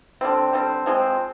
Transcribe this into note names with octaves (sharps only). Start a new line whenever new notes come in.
D3 G3 C4
D3 G3 C4
F3 G#3 C4